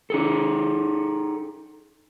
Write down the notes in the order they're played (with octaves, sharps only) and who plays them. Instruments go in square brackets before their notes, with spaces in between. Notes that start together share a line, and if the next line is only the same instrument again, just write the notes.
[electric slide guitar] D#4 G#4 A4